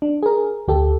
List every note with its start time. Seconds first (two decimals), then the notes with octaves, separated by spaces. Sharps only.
0.02 D4
0.23 G#4 A#4
0.68 D2 G4 A4